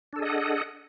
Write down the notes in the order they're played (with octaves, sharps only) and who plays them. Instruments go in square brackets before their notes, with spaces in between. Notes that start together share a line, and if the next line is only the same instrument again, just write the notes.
[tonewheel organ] D4
A4
G#4
D#5
F#5